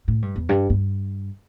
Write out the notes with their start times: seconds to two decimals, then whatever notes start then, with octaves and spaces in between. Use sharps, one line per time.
0.08 A2
0.22 G2
0.36 E2
0.49 G2
0.70 G2